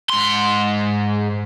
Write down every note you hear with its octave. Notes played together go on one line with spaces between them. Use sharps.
G#2 C6